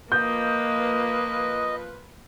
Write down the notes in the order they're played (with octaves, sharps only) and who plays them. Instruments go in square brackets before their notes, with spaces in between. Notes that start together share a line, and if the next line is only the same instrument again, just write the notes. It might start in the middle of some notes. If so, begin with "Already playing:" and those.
[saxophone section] F3 F4 B4 [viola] A#3 [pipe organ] D#5 [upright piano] G6